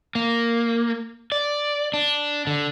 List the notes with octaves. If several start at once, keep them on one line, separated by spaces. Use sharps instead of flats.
A#3
D5
D4
D3